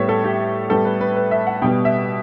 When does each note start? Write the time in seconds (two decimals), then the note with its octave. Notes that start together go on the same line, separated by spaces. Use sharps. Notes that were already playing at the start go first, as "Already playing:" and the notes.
Already playing: A2 G3 B3 C#5 E5
0.09 A4
0.24 G4
0.70 A2 G3 B3 A4
0.85 B4
1.01 B4
1.16 B4
1.31 E5
1.47 F#5
1.62 B2 G3 B3 G5
1.85 E5